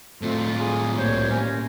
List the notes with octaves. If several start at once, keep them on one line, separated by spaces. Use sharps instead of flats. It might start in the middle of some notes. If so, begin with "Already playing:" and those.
A2 A3 C4 F4
G#4
C2 A#2 G3 C5 C#5
A#3 C#4